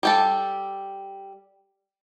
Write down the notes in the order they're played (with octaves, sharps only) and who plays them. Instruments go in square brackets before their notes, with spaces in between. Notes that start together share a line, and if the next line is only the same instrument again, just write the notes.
[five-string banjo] G3 G4 A4